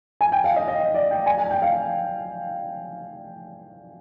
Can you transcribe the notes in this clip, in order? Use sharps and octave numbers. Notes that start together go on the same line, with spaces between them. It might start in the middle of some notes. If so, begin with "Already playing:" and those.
G#5
G5
F5
D#5
D#5
D5
G5
G#5
G#5
G5
F5